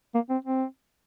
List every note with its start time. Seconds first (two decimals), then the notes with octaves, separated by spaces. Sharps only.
0.15 A#3
0.30 C4
0.45 C4